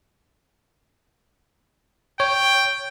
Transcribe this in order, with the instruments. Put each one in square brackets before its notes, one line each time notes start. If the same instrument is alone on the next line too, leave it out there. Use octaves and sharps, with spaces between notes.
[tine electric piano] C#5 [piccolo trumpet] G5